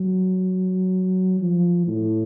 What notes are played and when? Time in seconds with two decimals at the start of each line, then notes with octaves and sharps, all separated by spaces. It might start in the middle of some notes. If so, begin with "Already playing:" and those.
Already playing: F#3
1.40 F3
1.87 A2